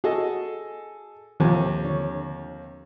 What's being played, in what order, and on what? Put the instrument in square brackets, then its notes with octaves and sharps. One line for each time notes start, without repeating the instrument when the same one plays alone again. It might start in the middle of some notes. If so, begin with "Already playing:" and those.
[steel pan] F#4 [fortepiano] G#4 A4 D#5
[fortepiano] D#2 C3 [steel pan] F3 A#3 A4
[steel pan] D3 C#5